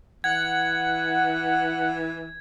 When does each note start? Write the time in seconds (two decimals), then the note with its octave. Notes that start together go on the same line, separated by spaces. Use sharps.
0.24 E3 F#5 G#6